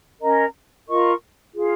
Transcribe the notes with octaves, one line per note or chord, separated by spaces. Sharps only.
C#4 A#4 D#5 A#5
F4 A#4 D#5 C#6
F4 G#4 F5